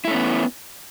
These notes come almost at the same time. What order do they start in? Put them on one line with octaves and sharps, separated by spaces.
E4 A3 C#4 B3